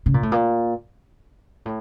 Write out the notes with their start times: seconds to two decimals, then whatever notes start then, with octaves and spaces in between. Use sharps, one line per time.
0.06 C#3
0.14 A#2
0.23 A2
0.32 A#2
1.66 A2